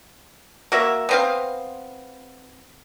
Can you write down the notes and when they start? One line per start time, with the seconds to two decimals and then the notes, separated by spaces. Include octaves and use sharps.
0.72 A#3 F#4 E5
1.09 B3 C4 F5